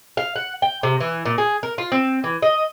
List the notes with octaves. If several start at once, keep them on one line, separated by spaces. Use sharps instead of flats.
F5
F#5
G5
C3
E3
A#2
G#4
A#4
F4
C4
E3
D#5